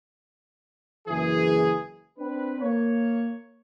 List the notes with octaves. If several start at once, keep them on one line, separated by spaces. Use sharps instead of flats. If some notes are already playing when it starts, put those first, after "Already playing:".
F#1 E3 G#4
C4 D4 B4
A#3 C#5